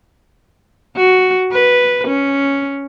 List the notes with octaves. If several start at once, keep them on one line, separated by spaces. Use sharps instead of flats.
F#4
B4
C#4